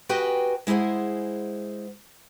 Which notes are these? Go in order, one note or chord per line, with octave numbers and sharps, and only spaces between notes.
F#4 G4 B4 D#5 G5 G#5
G#3 E4 G#4 C5 F#5